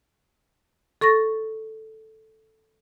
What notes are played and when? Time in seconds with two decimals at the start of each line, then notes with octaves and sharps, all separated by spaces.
1.01 A4 C#6 A6 A#6